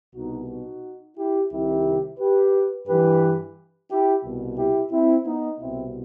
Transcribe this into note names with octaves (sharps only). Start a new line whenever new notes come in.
C2 B2 D#4 F#4
D#4 F#4
E4 G4
C2 C3 D#3 E4 G4
G4 B4
G2 E3 G4 B4
E4 G4
C2 B2
E4 G4
C4 E4
B3 D#4
C2 B2 C4 E4